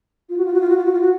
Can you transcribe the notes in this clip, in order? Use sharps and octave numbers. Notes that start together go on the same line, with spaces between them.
F4
F#4
F4
F#4
F4
F#4
F4
F#4
F4
F#4